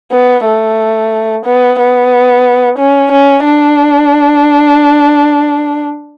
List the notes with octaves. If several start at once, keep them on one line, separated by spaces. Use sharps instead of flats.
B3
A3
B3
B3
C#4
C#4
D4